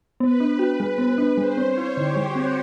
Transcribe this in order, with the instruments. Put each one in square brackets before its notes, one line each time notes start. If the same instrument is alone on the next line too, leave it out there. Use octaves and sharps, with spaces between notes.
[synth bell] B3 [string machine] B4
[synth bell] D4
F#4
G3
B3
D4
[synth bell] G3 [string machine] C5
[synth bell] C4
[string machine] C#5
[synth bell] E4
[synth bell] D3 [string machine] G4
[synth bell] G3
[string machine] F#4
[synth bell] C4